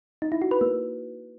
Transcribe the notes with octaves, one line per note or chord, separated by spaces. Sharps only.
D#4
E4
F#4
B4
A#3